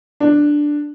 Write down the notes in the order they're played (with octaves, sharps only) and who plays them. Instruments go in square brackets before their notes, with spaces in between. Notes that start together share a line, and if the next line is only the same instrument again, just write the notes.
[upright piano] D4